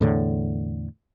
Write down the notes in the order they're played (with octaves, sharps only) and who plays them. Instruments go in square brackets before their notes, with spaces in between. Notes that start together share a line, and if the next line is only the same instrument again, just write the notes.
[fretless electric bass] E2 A2 D3